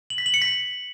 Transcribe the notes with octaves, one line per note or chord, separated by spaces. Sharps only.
F#7
B6
F#7
C#7
B6